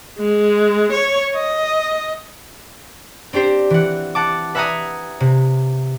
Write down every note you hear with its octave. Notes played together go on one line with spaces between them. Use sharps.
G#3
C#5
D#5
C4 D4 G4 C5
E3 F#5
F#5 A5 D6
B4 E5 F#5 G#5 A#5 D#6
C3